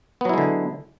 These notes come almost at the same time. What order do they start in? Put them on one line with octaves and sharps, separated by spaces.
B3 F#3 E4 G#3 D3